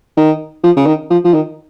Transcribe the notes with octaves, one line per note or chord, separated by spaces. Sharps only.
D#3
F3
C#3
D#3
F3
F3
D#3